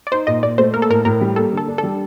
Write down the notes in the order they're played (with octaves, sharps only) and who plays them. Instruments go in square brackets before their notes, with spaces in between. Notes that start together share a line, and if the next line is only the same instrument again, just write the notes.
[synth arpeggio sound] D5
[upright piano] D#4 [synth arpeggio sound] C5
[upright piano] A#2 [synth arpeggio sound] D#5
[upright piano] A#2 [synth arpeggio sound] D5
[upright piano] A3 [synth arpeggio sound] C5
[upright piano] A#3 [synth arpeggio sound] A#4
[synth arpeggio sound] A4
[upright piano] A2 [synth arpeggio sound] A#4
[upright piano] A2 [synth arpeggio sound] A#4
[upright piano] G3
[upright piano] A#3 [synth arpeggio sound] A4
[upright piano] D3
[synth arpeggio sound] A4
[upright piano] D4
[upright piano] G3 [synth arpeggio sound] A4